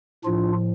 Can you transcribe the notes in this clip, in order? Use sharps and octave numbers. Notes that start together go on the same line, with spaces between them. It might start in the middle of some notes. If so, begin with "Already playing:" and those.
A2 F3 D4 F4